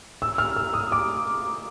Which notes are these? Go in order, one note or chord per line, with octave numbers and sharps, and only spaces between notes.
E6
F6
E6
D#6
D6